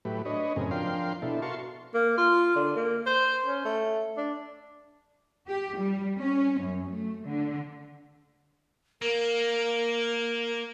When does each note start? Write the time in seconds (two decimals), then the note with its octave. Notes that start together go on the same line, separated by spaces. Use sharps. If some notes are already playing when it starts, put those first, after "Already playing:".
0.05 A2 F#3 A3 G4 B4
0.25 D4 B4 C#5 D#5
0.56 F#2 A2 C#3 C4 G#4 A#4
0.71 F3 D4 A#4 F5 G5 C6
1.22 B2 D4 E4 A4
1.42 F#4 A#4 F5 A5 C6 C#6
1.94 A#3
2.18 F4
2.56 D3
2.76 A#3
3.06 C5
3.45 C#4
3.65 A3
4.17 D4
5.48 G4
5.78 G3
6.18 C#4
6.61 F#2
6.91 A3
7.25 D3
9.02 A#3 A#4